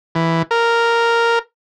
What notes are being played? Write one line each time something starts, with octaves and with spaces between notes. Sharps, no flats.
E3
A#4